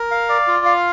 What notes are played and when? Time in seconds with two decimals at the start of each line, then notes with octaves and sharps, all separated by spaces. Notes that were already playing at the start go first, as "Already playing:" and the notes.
Already playing: A#4
0.11 F5
0.29 D5
0.47 F4
0.65 F5